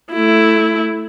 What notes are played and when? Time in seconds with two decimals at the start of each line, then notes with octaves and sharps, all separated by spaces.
0.13 A3 E4